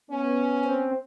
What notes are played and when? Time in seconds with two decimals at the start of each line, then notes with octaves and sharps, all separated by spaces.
0.10 B3 C#4
0.65 C4